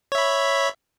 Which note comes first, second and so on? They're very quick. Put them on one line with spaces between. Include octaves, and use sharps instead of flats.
C#5 E5 B5